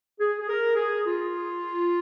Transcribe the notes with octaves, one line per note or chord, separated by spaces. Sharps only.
G#4
G#4
A#4
G#4
F4